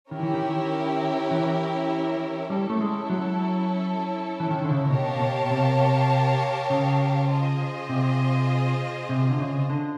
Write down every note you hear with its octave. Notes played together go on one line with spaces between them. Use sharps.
D#3 C#4 E4 G4 A#4
E3
D#3
E3
G3 C#4 E4 A4
A3
G#3
F#3
E3
D#3
D3
C#3
B2 G4 A#4 C#5 F5 A5
B2
C3
C#3
F4 G#4 C5 D#5
C3
C3
D3
C#3
D3